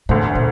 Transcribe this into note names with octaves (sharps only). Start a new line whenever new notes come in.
E1 D2 A2 D3
A#2